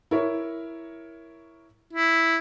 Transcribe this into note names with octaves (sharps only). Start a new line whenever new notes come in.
E4 A#4 C#5
E4